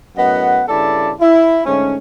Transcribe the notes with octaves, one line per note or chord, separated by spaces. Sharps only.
F#2 A2 B3 D#5 F#5
G2 C#3 E4 A4 D5 A5
E4
G#2 D3 A3 C#4